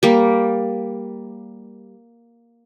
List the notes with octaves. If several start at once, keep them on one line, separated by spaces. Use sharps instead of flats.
G3 A#3